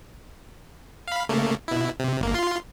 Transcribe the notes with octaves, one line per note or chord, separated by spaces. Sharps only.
F5 B5
C#3 A3 A#3
B2 E4
C3
G1 A#3
F4 C6